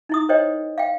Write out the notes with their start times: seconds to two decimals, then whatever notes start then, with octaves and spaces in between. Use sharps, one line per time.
0.09 D#4 E4 D#6
0.29 A#4 C5 C#5 D#5 G5
0.78 F5 G5